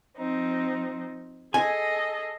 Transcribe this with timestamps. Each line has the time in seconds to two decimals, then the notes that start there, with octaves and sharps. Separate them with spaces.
0.15 F3 C4 D#4
1.54 G#4 A4 D#5 G#5